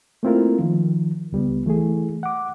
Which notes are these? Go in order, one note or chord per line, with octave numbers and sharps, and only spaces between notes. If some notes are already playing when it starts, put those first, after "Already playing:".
A3 A#3 C4 E4 F4 A#4
D#3 F3
C#2 G3 B3
E3 A3 E4 G#4
F#5 D6